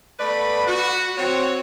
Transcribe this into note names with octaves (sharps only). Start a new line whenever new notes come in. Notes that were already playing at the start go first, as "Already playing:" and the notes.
A3 B3 B4 D5 B5
F#4
C4 F#4 C#5